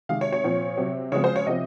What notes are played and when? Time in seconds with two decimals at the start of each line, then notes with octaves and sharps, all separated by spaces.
0.09 C3 D#3 G#3 F5
0.21 C#5
0.32 C#5
0.44 A#2 F3 C4
0.77 C3 F#3 C4
1.12 C#3 F3 G#3 C4 C#5
1.24 C5
1.36 C#5
1.46 C3 F3 C4 D#5